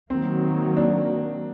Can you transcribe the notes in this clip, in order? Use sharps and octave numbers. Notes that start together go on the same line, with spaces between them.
D#3 F#3 A#3 C4
D4